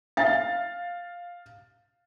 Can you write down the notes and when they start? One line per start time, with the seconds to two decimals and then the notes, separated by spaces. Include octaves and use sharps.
0.17 F5 A6